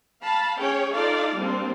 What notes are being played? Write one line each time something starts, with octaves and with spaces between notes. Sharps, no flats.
F5 A5 B5
C#4 G#4 C#5 G5
D#4 F4 A4 D5 F5
G3 A#3 C4 D4